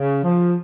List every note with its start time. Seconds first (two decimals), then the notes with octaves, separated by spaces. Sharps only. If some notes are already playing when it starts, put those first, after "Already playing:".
Already playing: C#3
0.23 F3